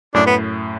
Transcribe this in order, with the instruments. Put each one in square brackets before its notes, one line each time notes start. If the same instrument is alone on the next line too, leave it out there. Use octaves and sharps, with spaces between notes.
[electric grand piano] F#2 A2 [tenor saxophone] D4
[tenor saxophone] B3